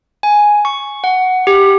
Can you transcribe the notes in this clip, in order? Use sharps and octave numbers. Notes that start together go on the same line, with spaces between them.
G#5
C#6
F#5
G4